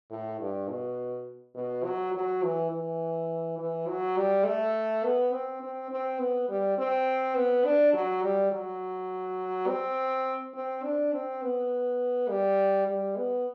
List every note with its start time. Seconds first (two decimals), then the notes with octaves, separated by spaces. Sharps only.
0.11 A2
0.40 G2
0.69 B2
1.55 B2
1.85 F#3
2.14 F#3
2.43 E3
2.71 E3
3.58 E3
3.88 F#3
4.17 G3
4.45 A3
5.04 B3
5.33 C4
5.61 C4
5.91 C4
6.20 B3
6.49 G3
6.78 C4
7.36 B3
7.65 D4
7.94 F#3
8.23 G3
8.51 F#3
9.68 C4
10.54 C4
10.84 D4
11.13 C4
11.42 B3
12.29 G3
12.87 G3
13.16 B3